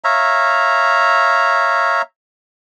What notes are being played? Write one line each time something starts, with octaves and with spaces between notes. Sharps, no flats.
C#5 E5 F5 A#5